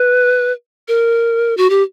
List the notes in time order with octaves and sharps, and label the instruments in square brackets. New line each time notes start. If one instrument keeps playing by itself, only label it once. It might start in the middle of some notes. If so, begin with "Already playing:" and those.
Already playing: [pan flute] B4
A#4
F#4
G4